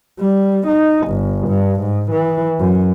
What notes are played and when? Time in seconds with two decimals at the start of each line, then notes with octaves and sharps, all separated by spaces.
0.20 G3
0.67 D#4
1.08 G1
1.48 G2
1.81 G#2
2.11 E3
2.59 F#2